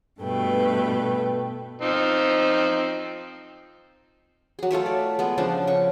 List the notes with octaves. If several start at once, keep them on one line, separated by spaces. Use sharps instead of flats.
G2 B2 A3 B4 G5
F3 C4 D#4
F#3 G#4
A3 F4 C#5 E5
D5
G#3 B3
C#3 F3 D4 C5
C#3 C#6